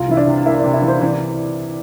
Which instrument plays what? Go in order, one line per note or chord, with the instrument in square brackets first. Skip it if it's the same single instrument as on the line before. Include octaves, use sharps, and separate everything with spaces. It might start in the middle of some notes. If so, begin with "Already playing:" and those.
Already playing: [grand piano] C2 [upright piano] F4
[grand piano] E3 [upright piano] E4
[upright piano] D4
[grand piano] C3
[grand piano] A#3 [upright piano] E4
[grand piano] C3 [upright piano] D4
[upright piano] E4
[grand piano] E3
[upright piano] C5
[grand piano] E3 [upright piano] D5